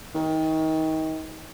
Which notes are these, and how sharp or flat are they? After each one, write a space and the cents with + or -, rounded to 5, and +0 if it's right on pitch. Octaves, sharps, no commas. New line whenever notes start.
D#3 +30